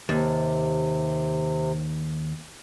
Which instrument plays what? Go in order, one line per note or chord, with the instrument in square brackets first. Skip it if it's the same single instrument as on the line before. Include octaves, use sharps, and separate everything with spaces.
[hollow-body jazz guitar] D#2 [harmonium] C3